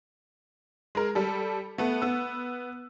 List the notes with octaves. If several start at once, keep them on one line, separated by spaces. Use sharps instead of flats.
G#3 A#4
G3 A4
A3 B3
B3 E6